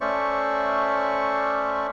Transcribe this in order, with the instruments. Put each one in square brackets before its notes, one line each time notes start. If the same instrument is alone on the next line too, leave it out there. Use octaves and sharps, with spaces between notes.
[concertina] A3 C#4 C5 D5 E5 C#6